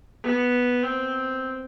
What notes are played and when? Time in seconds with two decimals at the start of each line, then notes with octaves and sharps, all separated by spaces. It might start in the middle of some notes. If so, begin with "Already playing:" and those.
0.24 B3
0.83 C4